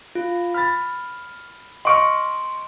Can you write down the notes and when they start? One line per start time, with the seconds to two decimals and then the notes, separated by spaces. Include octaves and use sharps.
0.15 F4
0.54 B5 F6 A6
1.85 D#5 C6 C#6 F6 D7